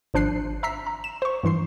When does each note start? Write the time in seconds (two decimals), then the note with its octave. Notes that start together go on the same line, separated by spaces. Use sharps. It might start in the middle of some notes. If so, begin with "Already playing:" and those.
0.14 G#1 F3 D4 F#6 C7 D#7
0.63 E5 A#5 E6 B6 C7
0.87 A#5
1.04 E7
1.22 C5 C#6
1.44 G2 E3 C6 C7